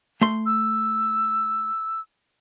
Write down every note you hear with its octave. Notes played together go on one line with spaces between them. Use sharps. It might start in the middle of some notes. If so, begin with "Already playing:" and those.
A3 C6
E6